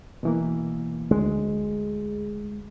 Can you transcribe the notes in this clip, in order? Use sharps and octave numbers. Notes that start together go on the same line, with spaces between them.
B2 E3 A#3
D2 G#3